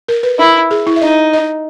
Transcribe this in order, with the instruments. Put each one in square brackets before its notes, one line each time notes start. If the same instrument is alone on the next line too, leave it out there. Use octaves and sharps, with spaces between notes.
[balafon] A#4
B4
[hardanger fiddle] E4 [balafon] A#4
[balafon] G#4
E4
E5
[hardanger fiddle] D#4 [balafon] D#5
[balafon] D#5